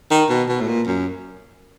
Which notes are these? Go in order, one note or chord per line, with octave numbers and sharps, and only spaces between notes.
D#3
B2
B2
A2
A#2
F#2